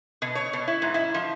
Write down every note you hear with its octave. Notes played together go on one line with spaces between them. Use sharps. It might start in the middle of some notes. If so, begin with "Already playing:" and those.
B2
C#5
B2
E4
G#2
E4
F3